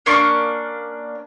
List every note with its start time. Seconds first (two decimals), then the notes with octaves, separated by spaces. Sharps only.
0.06 A#3 C#4 D4 C#6